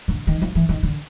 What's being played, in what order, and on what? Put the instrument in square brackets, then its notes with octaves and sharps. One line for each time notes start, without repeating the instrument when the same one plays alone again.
[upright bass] D3
D#3
F3
E3
D#3
D3